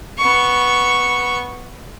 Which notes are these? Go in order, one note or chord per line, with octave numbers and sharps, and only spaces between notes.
B3 C#6